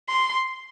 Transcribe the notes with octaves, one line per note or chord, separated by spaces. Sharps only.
C6